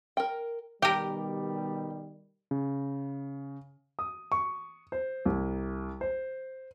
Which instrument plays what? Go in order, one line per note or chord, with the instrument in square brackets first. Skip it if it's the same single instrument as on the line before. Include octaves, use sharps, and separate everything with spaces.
[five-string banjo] A#4 G5
[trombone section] B2 D#3 G3 [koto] G4 A#4 [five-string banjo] G5
[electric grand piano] C#3
[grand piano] D#6
C#6
C5
C2
C5